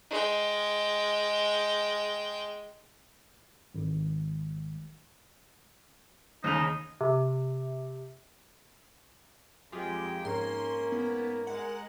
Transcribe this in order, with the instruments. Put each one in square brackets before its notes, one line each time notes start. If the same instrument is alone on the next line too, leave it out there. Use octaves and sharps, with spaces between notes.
[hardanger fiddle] G#3 G5
[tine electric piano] G#1
[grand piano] D#2 C#3 F7 [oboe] D#4
[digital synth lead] C3
[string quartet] F2 G#3 G5 [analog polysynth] F4 G4 G#4
[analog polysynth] G#2 [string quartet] A#3 C#4 [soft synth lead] A#4 [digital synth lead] C6
[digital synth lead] B3
[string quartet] G#3 [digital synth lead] F#5